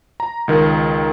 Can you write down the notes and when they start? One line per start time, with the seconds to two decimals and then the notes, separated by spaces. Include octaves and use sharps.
0.20 A#5
0.48 C#2 D#3 A#4